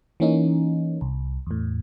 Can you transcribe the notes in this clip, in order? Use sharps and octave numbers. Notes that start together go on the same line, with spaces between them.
E3 A#3 C#4 D#4
C2
E2 A2